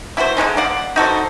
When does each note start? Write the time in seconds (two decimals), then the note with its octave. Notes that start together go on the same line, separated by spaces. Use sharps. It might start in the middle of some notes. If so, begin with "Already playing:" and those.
0.17 E4 F#4 A4 C5
0.37 D3 G#3 C#4 D#4
0.57 D5 F5 F#5
0.96 D#4 F#4 A4 C5